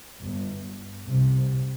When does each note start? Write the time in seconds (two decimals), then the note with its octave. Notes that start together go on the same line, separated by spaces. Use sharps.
0.21 G1 G2
1.07 C2 C3